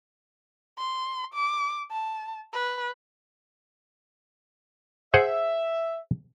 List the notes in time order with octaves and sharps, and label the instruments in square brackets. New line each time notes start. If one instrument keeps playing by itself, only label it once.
[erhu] C6
D6
A5
B4
[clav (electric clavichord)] G#4 C5 F#5 [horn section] E5